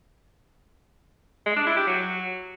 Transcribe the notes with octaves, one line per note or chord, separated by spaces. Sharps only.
G#3
D4
E4
G4
F#3